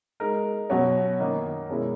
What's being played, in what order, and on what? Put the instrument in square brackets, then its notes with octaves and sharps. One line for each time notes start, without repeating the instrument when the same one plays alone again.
[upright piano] G#3 D#4 A#4
B2 F#3 C#4 F#4 C#5
F#2 D#3 A#3 D#4
B2 G#3 C#4 E4 A#4